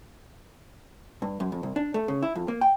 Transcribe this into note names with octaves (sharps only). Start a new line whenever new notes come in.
G2
F#2
F2
C2
D4
A3
C#3
E4
F2
A#3
G5